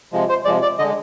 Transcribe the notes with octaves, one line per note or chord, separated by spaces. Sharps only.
C3 F3 G#3
C5
C3 F3 G#3 D5
D5
D3 G#3 D#5